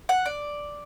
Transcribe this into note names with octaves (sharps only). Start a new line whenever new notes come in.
F#5
D5